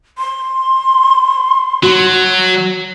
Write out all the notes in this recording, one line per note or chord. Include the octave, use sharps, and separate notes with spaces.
C6
F#3 F#4